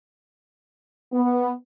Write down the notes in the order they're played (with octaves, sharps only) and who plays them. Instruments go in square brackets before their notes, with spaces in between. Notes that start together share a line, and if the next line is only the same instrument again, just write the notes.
[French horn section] B3